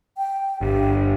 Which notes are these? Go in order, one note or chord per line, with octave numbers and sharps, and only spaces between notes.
G5
G1 G4